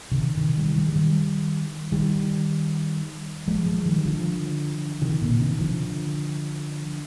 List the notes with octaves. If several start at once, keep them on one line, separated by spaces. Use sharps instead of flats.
C3 D#3
C3 D#3
D#3 G3
D#3 G3
G#3
D#3 G3
D#3 G3
F3 G#3
F3 G#3
D#3 G3
D3 F3
C3 D#3
A#2 D3
F3
C3 D#3
D3 F3